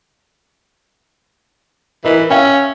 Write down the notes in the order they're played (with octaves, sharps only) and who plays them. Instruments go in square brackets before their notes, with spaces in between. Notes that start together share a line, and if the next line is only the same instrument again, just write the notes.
[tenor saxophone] E3 [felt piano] A#4 B4 D#5
[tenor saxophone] C#4 [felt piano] E5 F5 G5